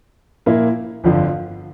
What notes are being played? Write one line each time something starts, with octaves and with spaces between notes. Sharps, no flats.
A#2 F3 A#3 E4 A#4
G1 F2 D3 F3